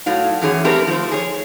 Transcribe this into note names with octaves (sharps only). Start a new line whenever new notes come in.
A2 F#3 F5
F#2 E3 G#4 C#5
A3 C4 G4 A#4 B4
F3 A3 C5
G#4 C#5